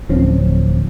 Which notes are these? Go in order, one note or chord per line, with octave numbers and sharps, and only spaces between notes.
D1 F3 C4 C#4